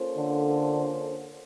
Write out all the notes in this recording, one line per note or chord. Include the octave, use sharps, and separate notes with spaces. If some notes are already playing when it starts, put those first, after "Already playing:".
Already playing: A#3 C#4 F4 A4 C5
D3